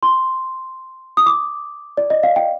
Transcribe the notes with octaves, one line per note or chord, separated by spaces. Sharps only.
C6
D#6
D6
D5
D#5
F5
G5